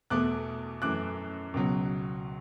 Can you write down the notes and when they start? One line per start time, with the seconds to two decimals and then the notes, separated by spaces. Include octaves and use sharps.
0.10 E2 B2 A3 D6 F#6
0.82 F#2 E3 A3 D6 F#6
1.54 C#2 B2 F#3